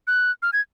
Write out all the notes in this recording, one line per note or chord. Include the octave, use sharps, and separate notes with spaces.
F#6
F6
G#6